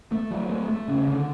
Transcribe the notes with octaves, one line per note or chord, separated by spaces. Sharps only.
A3
F#3
A3
A3
C#3
D3